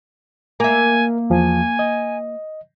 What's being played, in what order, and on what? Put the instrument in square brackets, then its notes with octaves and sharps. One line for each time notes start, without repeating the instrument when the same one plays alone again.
[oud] A#3 E5 [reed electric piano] A#4 [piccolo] G#5
[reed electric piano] E2 F3 [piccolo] G#5
[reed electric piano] D#5